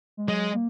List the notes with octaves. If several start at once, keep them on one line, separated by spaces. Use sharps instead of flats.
G#3
F#3 G#3
A#3